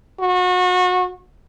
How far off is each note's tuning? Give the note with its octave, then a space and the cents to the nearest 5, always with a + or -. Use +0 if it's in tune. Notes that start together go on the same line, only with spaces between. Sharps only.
F#4 -30